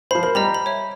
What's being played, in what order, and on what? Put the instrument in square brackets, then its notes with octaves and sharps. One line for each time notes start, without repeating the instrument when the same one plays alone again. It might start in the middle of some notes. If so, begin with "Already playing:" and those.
[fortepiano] F3 C5 [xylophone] B5 C7
[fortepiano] A#4 C5 [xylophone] B5
[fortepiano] G3 [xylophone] D#5 A#5 B5
[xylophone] B5
C#5 E5